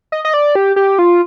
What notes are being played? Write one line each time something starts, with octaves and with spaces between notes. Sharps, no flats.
D#5
D#5
D5
G4
G4
F4